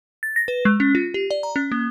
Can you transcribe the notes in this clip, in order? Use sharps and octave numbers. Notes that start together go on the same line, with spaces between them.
A6
A#6
B4
G#3
C#4
F4
G4
D5
A#5
C#4
A#3